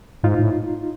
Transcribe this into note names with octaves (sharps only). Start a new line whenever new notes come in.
G#2 D#4 F4
A2